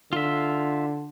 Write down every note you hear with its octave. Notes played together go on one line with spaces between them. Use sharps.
D3 F4 E5